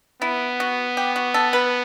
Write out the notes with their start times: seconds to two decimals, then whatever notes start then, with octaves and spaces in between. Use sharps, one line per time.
0.22 B3 E4
0.60 F#4
0.97 G4
1.16 F#4
1.34 A4
1.53 B4